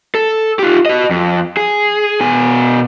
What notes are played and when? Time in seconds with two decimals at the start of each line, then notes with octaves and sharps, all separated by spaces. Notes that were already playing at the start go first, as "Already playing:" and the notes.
0.15 A4
0.59 F4 G4
0.86 F#4 D#5
1.10 F2
1.57 G#4
2.21 B2 G#5